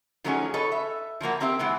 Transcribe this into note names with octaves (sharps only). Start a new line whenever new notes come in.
F3 F#3 A3 C#4 D#4 G#4
A4 B4 C#5 D#5
E5
F3 F#3 A#3 B3
A#3 C4 G4 E5 G5
E3 G#3 B3